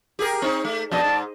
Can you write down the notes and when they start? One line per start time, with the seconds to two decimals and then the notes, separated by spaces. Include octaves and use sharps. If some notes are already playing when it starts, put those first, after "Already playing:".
0.19 G4 G#4 A#4
0.42 C4 D#4
0.65 A3
0.91 F2 B2 D5 D#5 A5
1.04 G#2